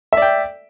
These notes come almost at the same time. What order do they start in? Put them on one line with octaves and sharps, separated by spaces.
E5 D5 G5